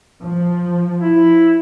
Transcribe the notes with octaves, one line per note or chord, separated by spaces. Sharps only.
F3
E4